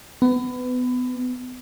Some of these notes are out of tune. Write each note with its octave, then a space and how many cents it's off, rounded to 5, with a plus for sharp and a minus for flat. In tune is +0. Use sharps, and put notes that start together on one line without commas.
B3 +25